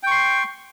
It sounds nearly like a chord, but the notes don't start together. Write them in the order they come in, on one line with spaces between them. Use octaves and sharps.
G5 C#6 C6